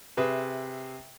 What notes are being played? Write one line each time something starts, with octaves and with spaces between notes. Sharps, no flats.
C3 G#4 B4 E5